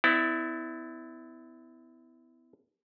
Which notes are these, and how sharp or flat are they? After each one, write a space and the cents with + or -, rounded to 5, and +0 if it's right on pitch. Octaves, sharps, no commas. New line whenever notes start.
B3 +35 E4 -15 D5 +0